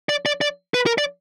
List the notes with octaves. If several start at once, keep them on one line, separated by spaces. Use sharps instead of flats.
D5
D5
D5
B4
A#4
D5